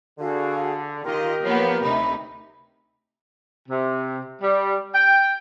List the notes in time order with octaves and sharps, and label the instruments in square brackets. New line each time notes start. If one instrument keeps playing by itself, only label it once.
[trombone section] D3 [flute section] F#4 G#4 F5
[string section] D#3 D#5 [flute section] F4 C6 [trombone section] G4 A#4
[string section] F3 A#3 B3 [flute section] C#5
[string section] D2 C3 D#4 [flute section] E5 B5
[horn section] C3
G3
G5